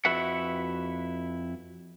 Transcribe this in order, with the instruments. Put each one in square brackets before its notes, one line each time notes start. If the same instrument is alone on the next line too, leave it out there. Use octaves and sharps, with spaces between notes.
[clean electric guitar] F2 E4 F#4 B4 E5 F#5